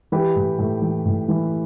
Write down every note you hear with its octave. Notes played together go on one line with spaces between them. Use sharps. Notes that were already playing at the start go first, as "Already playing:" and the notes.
E3 G4 B4
A2
A2
E3
A2
E3